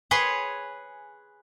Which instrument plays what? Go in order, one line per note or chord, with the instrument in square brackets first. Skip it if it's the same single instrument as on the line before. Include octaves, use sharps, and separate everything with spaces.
[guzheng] G#4 B4 C#5 C6